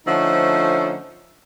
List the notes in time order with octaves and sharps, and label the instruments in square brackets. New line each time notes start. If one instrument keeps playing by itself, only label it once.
[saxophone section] D3 F3 A3 C#4 D#4 C5